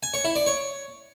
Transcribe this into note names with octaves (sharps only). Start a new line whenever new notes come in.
G#5
C#5
E4
D5
C#5